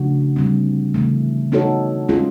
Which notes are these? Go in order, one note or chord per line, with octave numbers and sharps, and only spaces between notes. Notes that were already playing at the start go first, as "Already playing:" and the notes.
Already playing: C#3 F3 A3 D4 F#4
D3 G3 C4
C#3 E3 A3
B3 D#4 F#4 A4 C#5
G#3 C#4 F4 G#4